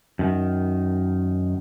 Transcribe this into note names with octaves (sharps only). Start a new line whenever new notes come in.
F#2 D#3